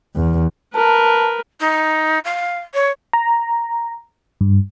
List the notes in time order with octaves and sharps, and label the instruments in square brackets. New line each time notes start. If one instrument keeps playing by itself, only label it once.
[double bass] E2
[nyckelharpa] A#4 B4 [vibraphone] A5
[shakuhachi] D#4
F5
C#5
[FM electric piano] A#5
G2